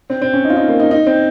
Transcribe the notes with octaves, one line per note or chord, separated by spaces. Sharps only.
C4
C4
C#4
D#4
F4
D#4
A#3
D#4
D#4
C4